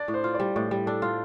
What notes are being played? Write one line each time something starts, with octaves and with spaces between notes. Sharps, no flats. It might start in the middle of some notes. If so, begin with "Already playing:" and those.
Already playing: D4 D5
A2
C5
F4
D5
G3
A2 D5
G3
D4 A4
F4